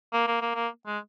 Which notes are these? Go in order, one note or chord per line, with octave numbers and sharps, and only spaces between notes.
A#3
A#3
A#3
A#3
G#3